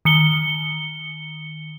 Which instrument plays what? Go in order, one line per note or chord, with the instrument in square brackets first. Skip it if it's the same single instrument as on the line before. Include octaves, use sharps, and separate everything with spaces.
[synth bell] D#3 C#7 G7